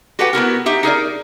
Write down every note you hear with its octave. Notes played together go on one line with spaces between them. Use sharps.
F#4 G4 A4 B4 F#5 G5
B3 E4 F#4 A#4
D#4 G4 E5
D#4 G#4 A#4 D5